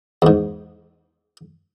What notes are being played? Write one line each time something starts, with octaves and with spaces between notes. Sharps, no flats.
E2 G#2